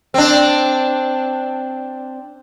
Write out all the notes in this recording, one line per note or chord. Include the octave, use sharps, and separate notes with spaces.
C4 D4